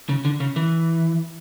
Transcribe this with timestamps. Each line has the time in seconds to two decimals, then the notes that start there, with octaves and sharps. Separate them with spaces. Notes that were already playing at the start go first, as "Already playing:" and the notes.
0.09 C#3
0.25 D3
0.40 C#3
0.56 E3